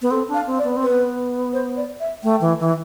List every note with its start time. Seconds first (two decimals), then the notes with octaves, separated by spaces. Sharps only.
0.02 B3
0.11 C4 A4
0.29 D4
0.34 F5
0.46 C4
0.58 D5
0.64 B3
0.77 C4
0.82 B4
0.89 B3
1.53 C5
1.77 D5
2.00 E5
2.23 A3 G5
2.41 E3
2.60 E3